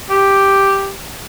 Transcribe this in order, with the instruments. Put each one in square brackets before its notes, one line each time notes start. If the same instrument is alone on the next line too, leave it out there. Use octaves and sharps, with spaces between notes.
[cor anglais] G4